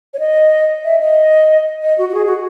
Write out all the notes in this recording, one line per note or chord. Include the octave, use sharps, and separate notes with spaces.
C#5
D#5
E5
D#5
D#5
F#4
F#4
G#4
F#4